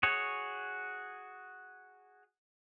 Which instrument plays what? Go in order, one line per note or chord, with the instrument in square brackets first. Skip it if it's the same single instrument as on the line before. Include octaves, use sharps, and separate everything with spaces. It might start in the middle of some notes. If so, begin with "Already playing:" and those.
[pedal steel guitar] F#4 G#4 C#5